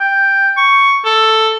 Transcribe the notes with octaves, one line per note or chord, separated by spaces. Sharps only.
G5
C#6
A4